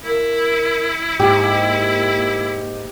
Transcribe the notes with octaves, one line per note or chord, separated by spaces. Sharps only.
E4 A#4
G#2 A#3 G4